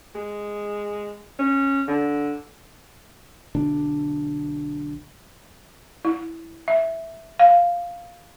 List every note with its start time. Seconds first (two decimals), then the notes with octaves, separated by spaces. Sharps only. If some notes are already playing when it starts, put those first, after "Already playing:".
0.15 G#3
1.39 C#4
1.88 D3
3.55 B1 D3 D4
6.05 E4
6.68 E5
7.39 F5